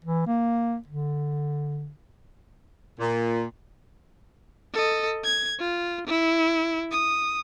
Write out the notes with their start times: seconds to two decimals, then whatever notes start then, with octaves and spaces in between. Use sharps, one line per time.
0.04 E3
0.27 A#3
0.87 D3
2.99 A#2
4.73 A4 D#5
5.24 G#6
5.59 F4
6.07 E4
6.92 D#6